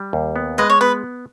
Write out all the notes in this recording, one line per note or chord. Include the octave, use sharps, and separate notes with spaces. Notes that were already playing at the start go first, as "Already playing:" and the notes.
Already playing: G3
D#2
B3
G#3 B4 D#5
C#5
B3 B4